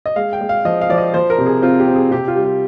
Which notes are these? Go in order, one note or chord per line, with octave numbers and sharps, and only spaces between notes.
D#5
G#3 F5
G5
G#3
F5
F3 D#5
F5
F3 D5
D#5
F3 C5
A#4
C3
G#4
C4 F4
G4
C4
G#4
C3 G4
F4
G3
F4